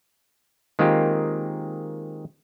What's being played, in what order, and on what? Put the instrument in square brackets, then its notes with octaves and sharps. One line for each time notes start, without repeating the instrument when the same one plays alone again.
[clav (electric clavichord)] D#3 G#3 A#3 C4 F4 G4